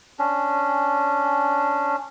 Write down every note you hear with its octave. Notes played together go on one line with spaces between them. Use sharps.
C#4 D4